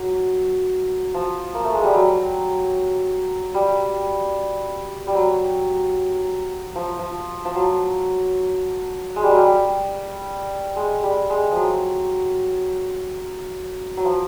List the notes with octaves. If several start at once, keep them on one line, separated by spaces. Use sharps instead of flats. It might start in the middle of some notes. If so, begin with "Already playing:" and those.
Already playing: F#3
F3
A#3
A3
G#3
G3
F#3
G3
G3
F#3
F3
F3
F3
F#3
G#3
G3
F#3
G3
G#3
G3
G#3
F3 F#3
F#3
F3